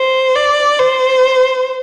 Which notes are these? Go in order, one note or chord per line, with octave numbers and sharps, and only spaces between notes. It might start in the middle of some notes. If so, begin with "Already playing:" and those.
Already playing: C5
D5
C5